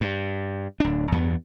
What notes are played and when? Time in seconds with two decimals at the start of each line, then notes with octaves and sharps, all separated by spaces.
0.01 G2
0.80 D1 D4
1.12 E2 G2 B3